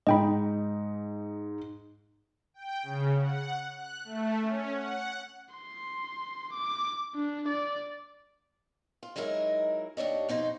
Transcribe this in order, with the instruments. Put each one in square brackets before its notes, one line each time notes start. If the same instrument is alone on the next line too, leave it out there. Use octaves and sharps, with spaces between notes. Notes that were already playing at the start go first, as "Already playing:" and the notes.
[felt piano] G#2 D#4 [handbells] D#5 G5 B5
[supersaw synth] G5
C#3
F#5
F#6
A3
C#4
F#5
[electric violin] C6
D6
D4
D5
[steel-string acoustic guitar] F4
F#3 G#3 D#4 E4 A#4
D#2 D4 C#5 D#5
F2 B2 D#4 C5